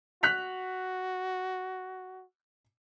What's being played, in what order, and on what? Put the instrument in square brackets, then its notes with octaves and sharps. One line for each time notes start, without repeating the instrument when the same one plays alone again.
[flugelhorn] F#4 [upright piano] F#6 B6 F7